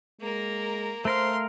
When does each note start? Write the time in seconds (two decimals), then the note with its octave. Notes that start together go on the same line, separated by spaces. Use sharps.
0.21 G#3 A#3 A#4
1.05 A3 A#4 C5 F5 C6